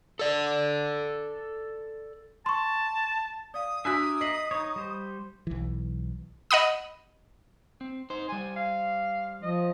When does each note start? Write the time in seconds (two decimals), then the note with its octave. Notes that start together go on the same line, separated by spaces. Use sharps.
0.19 A4 D5
2.46 A5 C6 C#6
3.54 D5 F5 D#6
3.85 D4 F#4 A#4 D5 E5 G#5 F#6 B6
4.21 D#5 B6 C7 F#7
4.51 D#4 C#5 C#6
4.76 G3 C5
5.47 B1 E3
6.51 D#5 F#5 B5 D#6
7.81 C4
8.10 D#4 C5
8.29 G3 C5 G#5
8.56 F5
9.43 F3 D#5